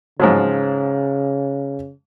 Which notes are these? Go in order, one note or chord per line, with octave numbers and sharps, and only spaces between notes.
G#2 C#3 F3 F#3